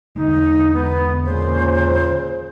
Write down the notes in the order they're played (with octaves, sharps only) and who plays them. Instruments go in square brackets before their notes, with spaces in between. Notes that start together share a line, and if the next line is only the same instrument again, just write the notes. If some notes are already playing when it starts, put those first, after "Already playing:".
[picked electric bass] E2 D3 G#3 [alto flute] D#4
[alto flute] B3
[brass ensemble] A#2 C#3 [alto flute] C5